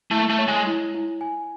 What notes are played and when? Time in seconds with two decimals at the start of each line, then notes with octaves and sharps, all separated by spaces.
0.11 A3 E4
0.30 A3
0.38 C#5
0.48 G#3
0.67 E4
0.94 E4
1.21 G#5